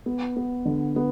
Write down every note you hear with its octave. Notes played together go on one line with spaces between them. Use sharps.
B3
B3
D3
B3